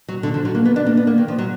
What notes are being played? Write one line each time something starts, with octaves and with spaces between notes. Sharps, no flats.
F#3
D3
F3
F#3
A#3
B3
D4
A#3
B3
A#3
D#3
F3
F#3